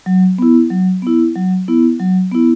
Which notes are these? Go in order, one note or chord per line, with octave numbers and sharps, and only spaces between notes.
F#3
B3 E4
F#3
B3 E4
F#3
B3 E4
F#3
B3 E4